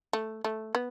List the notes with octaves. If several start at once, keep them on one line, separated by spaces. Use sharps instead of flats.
A3
A3
B3